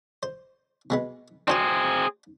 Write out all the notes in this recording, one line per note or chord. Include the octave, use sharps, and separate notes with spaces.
C5
B2 G#3 B3
C4 D4 F#4 G#4 C5